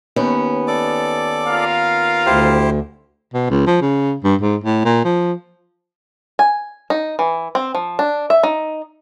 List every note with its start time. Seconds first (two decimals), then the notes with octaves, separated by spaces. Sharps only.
0.16 D#2 B3 C#4
0.68 A4 D5 D6
1.48 F4 A#4 F5
2.26 D2 E4 G4 C5
3.34 B2
3.50 C#2
3.67 F3
3.82 C#3
4.24 G2
4.42 G#2
4.64 A2
4.85 A#2
5.05 F3
6.39 G#5
6.90 D#4
7.19 E3
7.55 C4
7.75 F3
7.99 D4
8.30 E5
8.43 D#4